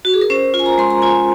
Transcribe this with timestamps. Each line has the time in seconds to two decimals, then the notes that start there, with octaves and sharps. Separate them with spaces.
0.05 F#4
0.14 G#4
0.21 A#4
0.30 C#4 C5
0.54 F4
0.59 G#5
0.66 A#5
0.78 G#3 C6
0.90 A#5
1.02 F4 G#5